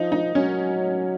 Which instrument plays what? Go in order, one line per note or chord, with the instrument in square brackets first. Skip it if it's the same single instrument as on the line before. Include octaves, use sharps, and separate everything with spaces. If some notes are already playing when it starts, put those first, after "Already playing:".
Already playing: [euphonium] F3 [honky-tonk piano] D#4
[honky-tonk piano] D#4
[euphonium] F#3 [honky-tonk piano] C#4